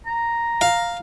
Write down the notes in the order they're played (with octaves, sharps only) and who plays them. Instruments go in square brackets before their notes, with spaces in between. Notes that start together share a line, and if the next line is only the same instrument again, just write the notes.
[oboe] A#5
[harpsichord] F5